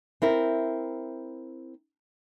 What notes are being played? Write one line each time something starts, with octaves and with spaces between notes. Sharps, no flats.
C4 E4 A#4